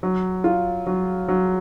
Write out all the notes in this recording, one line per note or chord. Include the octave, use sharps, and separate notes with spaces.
F#3
F4
F#3
F#3